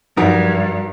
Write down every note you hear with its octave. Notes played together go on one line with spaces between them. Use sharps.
G2 F3 F#3 D#4 F#4 A#4